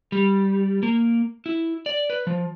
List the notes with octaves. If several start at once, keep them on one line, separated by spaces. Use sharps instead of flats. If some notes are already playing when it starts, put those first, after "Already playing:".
G3
A#3
E4
D5
B4
F3